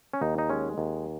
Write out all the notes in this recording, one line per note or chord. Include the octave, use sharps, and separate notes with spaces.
C#4
D#2 D#4
D#4
G#3 C#4
D#2